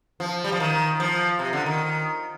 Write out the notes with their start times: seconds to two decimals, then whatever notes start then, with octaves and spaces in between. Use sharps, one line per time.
0.20 F3
0.44 G3
0.52 F3
0.60 D#3
1.00 F3
1.39 C3
1.53 D3
1.66 D#3